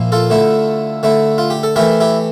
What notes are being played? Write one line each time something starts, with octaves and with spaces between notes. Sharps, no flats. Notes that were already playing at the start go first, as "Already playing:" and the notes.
Already playing: A#2 F3 A#3 E4
F4 A4
D3 A3 E4
D3 A3 E4
F4
G4
A4
E3 A3 E4 G4 A#4
E4 G4